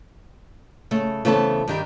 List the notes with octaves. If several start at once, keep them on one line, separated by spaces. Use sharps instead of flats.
C#3 A3
C#3 E3 A3 B3 C4 A5
G2 D#3 G3